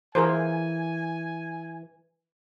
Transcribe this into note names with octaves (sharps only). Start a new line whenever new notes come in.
E3 G#4 A#4 C5 G#5